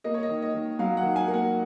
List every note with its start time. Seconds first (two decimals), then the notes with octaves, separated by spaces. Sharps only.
0.04 A#3 D#5
0.14 C#5
0.23 D#5
0.29 D#3
0.42 D#5
0.54 D#3
0.79 F#3 F5
0.97 F#5
1.03 D#3
1.16 G#5
1.28 A#3
1.34 F#5